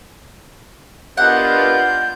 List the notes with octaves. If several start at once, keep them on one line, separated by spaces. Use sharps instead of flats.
B3 D4 F4 G4 A#4 D#5 F#5 G6